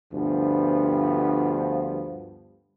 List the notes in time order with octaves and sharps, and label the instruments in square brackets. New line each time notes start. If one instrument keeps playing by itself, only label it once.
[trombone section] D2 G2 F3 B3